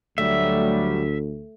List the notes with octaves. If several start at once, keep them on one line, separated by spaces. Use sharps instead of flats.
D2 F#3 G3 A3 E5